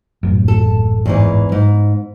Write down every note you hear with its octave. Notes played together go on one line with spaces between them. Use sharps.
D#1 A1 F#2
A4
E2 G#2 E3
G#2